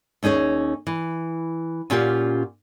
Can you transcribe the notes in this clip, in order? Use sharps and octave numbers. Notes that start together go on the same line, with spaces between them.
D#2 C#4 D#4 G#4 C#5
E3
A#2 C#4 F4 G4 F#5